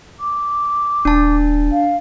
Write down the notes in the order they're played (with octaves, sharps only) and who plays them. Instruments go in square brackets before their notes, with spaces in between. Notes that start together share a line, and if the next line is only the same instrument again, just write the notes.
[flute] D6
[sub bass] D#1 [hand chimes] D4 A5
[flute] F5